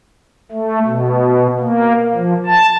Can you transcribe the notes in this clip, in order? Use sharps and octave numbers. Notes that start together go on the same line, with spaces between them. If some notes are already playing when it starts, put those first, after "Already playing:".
A3
B2
A#3
F3
A5